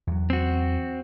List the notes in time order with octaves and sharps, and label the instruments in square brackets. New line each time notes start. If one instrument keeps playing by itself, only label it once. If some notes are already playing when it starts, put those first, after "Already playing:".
[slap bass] E2 F#3
[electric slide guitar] C4 F#4